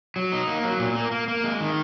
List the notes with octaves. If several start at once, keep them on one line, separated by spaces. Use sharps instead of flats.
F#3
D#4
A#3
F#3
A#2
A#3
A#3
A#3
G#3
D#3